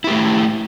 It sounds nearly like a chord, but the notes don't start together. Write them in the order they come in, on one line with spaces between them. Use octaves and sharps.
E4 G4 A3